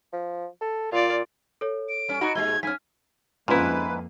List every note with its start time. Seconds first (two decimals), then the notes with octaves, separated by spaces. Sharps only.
0.13 F3
0.62 A4
0.92 A#2 F4 D5
1.61 A4 C#5
1.89 D7
2.09 G3 C#4
2.21 D#4 F#4 D#5 A#5 B5
2.35 A#2 G#3 G4 G#6 G7
2.63 G2 C#4 G#5 F6 B6
3.48 F2 G#2 G#3 A#3 C#4 E4 F4 B4